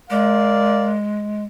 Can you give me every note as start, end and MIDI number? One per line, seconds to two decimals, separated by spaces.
0.10 1.44 56
0.10 0.95 70
0.10 0.95 74
0.10 0.95 77